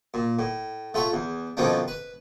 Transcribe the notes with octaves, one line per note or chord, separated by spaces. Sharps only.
A#2
A2
A3 F4 C#5 E5
E2
F2 B2 D#3 F3 C#4 D4
B4